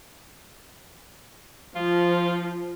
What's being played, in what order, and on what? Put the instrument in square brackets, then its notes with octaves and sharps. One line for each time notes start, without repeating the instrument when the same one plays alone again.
[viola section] F3 [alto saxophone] F4